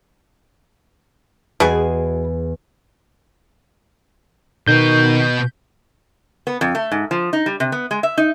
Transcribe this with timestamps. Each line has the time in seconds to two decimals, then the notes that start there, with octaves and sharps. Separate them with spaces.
1.60 E2 B2 G#4 G#5
4.67 B2 D#3 B3 G6
6.47 B3
6.61 F2
6.75 A3
6.91 G#2
7.11 F3
7.33 D#4
7.46 G3
7.60 C3
7.72 B3
7.91 G#3
8.03 E5
8.17 D#4